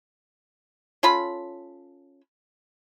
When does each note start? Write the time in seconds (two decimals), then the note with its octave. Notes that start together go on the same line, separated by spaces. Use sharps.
1.03 C#4 F4 A4 B5